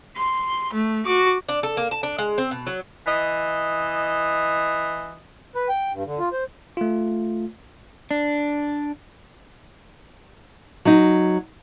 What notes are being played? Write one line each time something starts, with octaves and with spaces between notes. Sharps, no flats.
C6
A3
F#4 D6
D4
A4
A#3
A5
D4
G#3
C4
B2
F#3
E3 D#5
B4
G5
G2
D3
F4
C5
A3 F4
D4
F#3 D#4